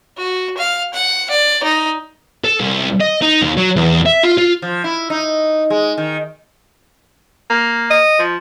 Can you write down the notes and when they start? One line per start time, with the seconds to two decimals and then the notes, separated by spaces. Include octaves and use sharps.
0.17 F#4
0.57 F5
0.94 F#5
1.30 D5
1.63 D#4
2.45 A4
2.60 C2
3.00 D#5
3.22 D#4
3.42 D#2
3.57 F#3
3.76 E2
4.06 E5
4.24 F4
4.38 F4
4.62 F3
4.84 E4
5.10 D#4
5.70 G#3
5.98 D#3
7.50 A#3
7.91 D#5
8.19 F3